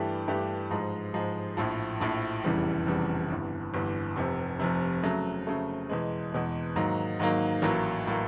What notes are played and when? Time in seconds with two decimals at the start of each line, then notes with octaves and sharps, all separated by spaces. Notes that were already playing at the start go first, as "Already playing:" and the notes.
Already playing: G2 E3 A3 D4 G4
0.28 G2 E3 A3 D4 G4
0.71 G#2 F3 G#3
1.14 G#2 F3 G#3
1.57 A#1 A2 F3
2.00 A#1 A2 F3
2.44 F1 E2 C#3 E3 G3
2.86 F1 E2 C#3 E3 G3
3.30 G1 G2 E3
3.74 G1 G2 E3
4.16 F1 F2 C3
4.60 F1 F2 C3
5.03 C#3 F#3 A3
5.47 C#3 F#3 A3
5.89 E2 B2 G#3
6.32 E2 B2 G#3
6.76 G#2 D#3 F#3 A#3
7.19 G#2 D#3 F#3 A#3
7.62 A1 A2 F#3 A#3
8.07 A2 F#3 A#3